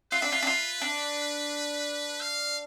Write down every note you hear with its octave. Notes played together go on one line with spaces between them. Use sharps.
F4 B4
D4
F4
D4
F4
D4
F5